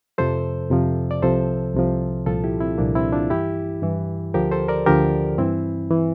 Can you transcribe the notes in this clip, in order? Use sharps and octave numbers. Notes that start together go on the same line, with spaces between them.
F2 C3 F3 A4 C5
F2 C3 F3
D5
C2 C3 F3 A4 C5
C2 C3 F3
C2 A#2 F3 F4 A4
E4 G4
C4 E4
C2 A#2 F3 A#3 D4
C4 E4
D4 F4
G2 E3 E4 G4
G2 E3
D2 D3 F3 G4 A#4
A4 C5
A#4 D5
D2 D3 F3 G4 A#4
G2 E3 C4 E4
E3